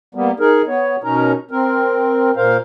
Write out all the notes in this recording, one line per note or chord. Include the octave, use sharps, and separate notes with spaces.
G3 A#3 B3
D#4 G#4 A#4
B3 C#5
B2 C#4 D#4 A#4 A#5
C4 A#4
A#2 A#4 C5 F5